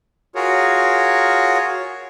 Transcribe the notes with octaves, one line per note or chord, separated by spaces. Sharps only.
F4 F#4 G#4 A#4 C#5